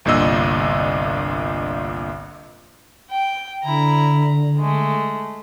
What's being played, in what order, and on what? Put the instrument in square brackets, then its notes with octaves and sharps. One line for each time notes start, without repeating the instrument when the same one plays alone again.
[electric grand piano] G1 C2 A#2 D4 D#5 E6
[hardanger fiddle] G5
[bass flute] D3 [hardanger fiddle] E4 A#5
[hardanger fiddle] G#3 A3